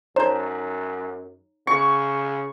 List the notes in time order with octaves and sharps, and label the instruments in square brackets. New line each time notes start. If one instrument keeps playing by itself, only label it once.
[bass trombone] F#2 [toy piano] D#4 C#5 A#5 [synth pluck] C5 G6
[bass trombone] C#3 [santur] C#6